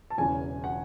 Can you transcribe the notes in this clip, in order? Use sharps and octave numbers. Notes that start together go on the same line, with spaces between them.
A5
E1 E2 C#3 E3 G#5
F#5